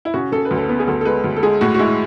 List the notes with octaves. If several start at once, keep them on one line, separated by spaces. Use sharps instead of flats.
E4
C#3 F#4
C#3 A4
B4
D2
A4
B3
G#4
D2 A4
A4
G#3 B4
D2
A4
G#3 G#4
A2 F#4
F#4
G#3 E4